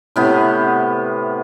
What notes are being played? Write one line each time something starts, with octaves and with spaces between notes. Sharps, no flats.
A2 C3 B3